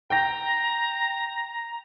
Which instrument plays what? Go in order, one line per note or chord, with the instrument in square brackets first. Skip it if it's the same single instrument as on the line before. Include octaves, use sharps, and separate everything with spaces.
[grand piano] G5 G6 A#6 [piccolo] A#5